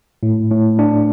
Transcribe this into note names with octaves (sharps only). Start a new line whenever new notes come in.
A2
A2
D4